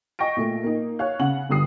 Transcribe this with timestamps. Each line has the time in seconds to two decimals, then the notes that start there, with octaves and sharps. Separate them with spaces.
0.19 D#5 G5 C#6 A#6 D7
0.36 A#2 A3
0.63 A#3 D#4
0.99 C#5 F5 F#6
1.19 C#3 F#5 F#7
1.49 G1 D3 G3 D#6 C7